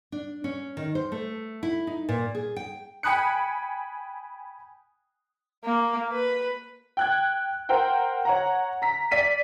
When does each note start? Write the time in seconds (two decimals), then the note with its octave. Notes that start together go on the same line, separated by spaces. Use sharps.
0.12 D4
0.44 C#4
0.77 D#3
0.95 C5
1.12 A3
1.63 E4
1.87 D#4
2.09 A#2
2.35 G#4
2.56 G5
3.03 G5 G#5 B5 D#6 F#6 C#7
5.64 A#3
6.12 B4
6.97 G5 F#6 G#6
7.69 A#4 C5 F#5 G5
8.25 C#5 F#5 A#5
8.82 A#5 B6
9.11 D5 B6 D#7